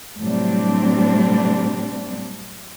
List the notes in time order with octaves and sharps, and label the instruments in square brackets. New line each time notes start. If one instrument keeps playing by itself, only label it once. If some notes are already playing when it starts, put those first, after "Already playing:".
[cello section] A2 C3 F#3 G3 C4 D4